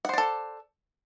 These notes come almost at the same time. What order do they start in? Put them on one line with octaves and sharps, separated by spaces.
F#5 C5 D5 A4